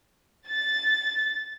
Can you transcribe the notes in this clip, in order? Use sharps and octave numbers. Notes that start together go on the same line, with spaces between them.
A6